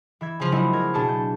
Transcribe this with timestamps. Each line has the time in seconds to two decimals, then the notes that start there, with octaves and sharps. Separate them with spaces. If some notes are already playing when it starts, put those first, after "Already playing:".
0.21 E3 E5 G#6
0.40 C#3 F3
0.52 F3 F#3 G#3 A#3 D#4 E4
0.73 A#4 G#6
0.94 B2 D4 G#4 A5 C#7
1.09 G6